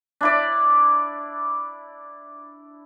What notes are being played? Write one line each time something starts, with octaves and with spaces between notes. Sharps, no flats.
D4 E4 D5